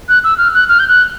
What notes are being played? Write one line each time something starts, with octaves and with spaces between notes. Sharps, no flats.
F#6
E6
F6
F#6
F6
G6
F#6